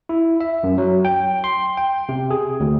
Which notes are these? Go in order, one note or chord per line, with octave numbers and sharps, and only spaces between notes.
E4
E5
F#2
F#3
G5
C6
G5
C3
G#4
D2